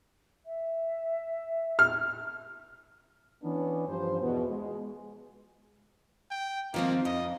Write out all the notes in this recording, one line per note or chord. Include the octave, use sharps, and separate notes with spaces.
E5
F6
E3 B3 C#4 D4
G2 F3 C5
E2 B2
G#3
G5
D#3 F3 A#3 C4
F2 D#5